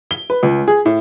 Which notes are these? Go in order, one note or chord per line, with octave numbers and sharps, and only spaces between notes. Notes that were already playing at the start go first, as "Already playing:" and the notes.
G7
B4
C#2
G#4
A2